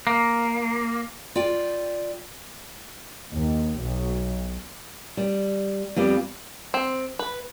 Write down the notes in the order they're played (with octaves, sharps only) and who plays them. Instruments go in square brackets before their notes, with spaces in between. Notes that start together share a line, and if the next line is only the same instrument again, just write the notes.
[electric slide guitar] A#3
[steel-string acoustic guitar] F4 D5 G5
[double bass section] D#2
B1
[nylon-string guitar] G3
F2 G3 B3 G4
[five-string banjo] C4
B4